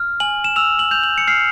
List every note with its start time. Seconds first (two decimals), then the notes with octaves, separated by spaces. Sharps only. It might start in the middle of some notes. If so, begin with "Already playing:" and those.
Already playing: F6
0.20 G#5 F#7
0.44 E7
0.56 E6 F7
0.79 F#7
0.91 G6 F7
1.03 F#7
1.18 C#7
1.27 F6 C7